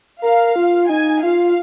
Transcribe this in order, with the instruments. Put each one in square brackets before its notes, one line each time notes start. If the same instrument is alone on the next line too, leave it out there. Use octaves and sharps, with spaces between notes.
[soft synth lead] A#4 [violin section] F5
[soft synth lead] F4
[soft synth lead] D#4 [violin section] G#5
[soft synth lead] F4 [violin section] F5